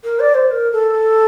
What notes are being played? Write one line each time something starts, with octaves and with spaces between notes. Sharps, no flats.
A#4
D5
C5
A#4
A4